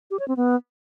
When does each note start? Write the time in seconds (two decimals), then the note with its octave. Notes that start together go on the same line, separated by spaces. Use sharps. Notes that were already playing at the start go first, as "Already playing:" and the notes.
0.11 G4
0.19 C#5
0.28 C4
0.37 B3